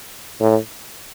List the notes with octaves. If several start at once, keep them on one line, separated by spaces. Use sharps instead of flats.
A2